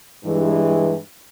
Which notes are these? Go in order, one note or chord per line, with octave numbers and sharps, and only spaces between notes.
G2 E3 G#3